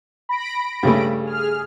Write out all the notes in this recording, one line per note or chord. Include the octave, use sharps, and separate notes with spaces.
B5 A#6 D7
G2 C#3 A3
G#4 F6